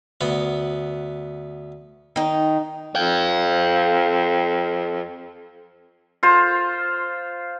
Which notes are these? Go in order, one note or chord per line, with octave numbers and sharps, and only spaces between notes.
D2 B3 B4
D#3 D#4
F2 F5 G5
F4 C5